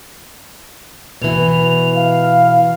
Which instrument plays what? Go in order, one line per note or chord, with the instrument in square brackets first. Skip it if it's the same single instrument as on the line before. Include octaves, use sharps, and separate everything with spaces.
[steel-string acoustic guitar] B2 E3 [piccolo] F7
[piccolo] F5